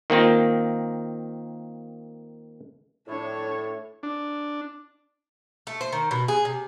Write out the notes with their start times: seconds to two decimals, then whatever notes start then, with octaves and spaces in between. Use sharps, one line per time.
0.10 D#3 A#3 C4 F4
3.07 A2 D4 C#5
4.03 D4
5.67 A3
5.81 C5
5.93 D#3
6.11 B2
6.28 G#4
6.45 C3